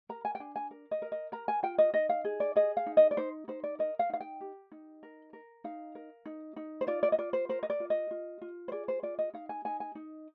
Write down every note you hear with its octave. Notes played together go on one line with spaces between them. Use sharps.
A#4 A#5
G#5
G5
D4 G#5
G#5
A#4
D#5
A#4
D#5
A#4 A#5
G#5
F4 G5
D#5
D#4 D#5
F5
G#4
D5
G#4 D#5
F5
D#4
D#5
D5
D#4 C5
D#4 C5
D5
A#4 D#5
F5
D#4 F5
G5
G4
D#4
A#4
A#4
D#4 F5
A#4
D#4
D#4
C5
F4 D5
D5
D#5
F4 D5
C5
A#4 C5
D#5
D5
F4
D#5
F4
F4
C5
G#4 D5
C5
F4 D5
D#5
D#4 F5
G#5
D#4 G#5
G#5
D#4